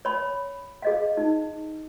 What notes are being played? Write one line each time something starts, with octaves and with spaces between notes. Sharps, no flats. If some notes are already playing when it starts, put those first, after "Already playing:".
C#5 B5
G#4 D#5 F5
D#4